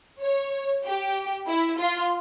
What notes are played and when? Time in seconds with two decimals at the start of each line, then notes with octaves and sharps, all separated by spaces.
0.21 C#5
0.85 G4
1.47 E4
1.77 F4